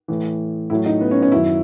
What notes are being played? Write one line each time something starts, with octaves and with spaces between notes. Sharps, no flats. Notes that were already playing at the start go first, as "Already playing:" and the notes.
A2 E3
A2 F#3 E4
D#4
B3
C#4
C#4
F#2 D#3 F#3 E4